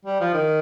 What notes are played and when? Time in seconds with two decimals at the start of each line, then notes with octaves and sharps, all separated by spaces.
0.05 G3
0.20 F3
0.34 D#3